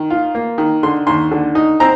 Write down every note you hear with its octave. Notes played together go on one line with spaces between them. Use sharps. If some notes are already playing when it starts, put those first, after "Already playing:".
Already playing: D#3
F4
A#3
D#3
D3 C6
D#2 C6
D3
D#4
C4 A#5